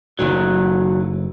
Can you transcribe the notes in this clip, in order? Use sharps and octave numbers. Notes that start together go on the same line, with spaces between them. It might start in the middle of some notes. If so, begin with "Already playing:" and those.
F#1 A2 D#3 F#3